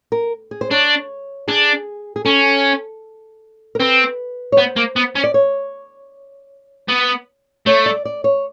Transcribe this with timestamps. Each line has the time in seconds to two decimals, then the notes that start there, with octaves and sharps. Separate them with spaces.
0.12 A#4
0.51 G#4
0.61 C5
0.71 D4 C#5
1.48 D4 G#4
2.16 G#4
2.25 C#4 A4
3.75 A#4
3.79 C4 B4
4.52 C#5
4.57 B3 C5
4.76 A#3
4.96 B3
5.16 C#4
5.24 D5
5.34 C#5
6.89 B3
7.66 A3 C#5
7.86 D5
8.05 D5
8.24 C#5